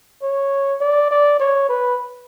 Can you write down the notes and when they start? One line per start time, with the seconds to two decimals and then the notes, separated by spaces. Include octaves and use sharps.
0.22 C#5
0.81 D5
1.11 D5
1.40 C#5
1.69 B4